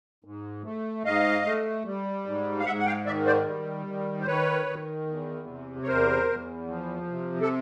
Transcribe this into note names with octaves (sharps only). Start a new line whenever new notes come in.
G#2
A3
G#2 D#5 F5
A3
G3
G#2
F5
G#2 E5 F#5
F#5
F5 G5
D#3 D5 E5
C5 D5
G3
D#3
C5
D#3 B4 C#5
D#3
E2
C3
C#5
E2 A#4 C5
E2
F3
C3
A4